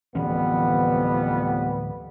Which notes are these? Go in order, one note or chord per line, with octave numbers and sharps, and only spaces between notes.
D1 F2 E3 G3 B3 C#4